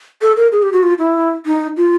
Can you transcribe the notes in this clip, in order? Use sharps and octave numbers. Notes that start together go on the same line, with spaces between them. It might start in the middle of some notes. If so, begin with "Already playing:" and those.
A4
A#4
G#4
G4
F#4
F4
E4
D#4
F4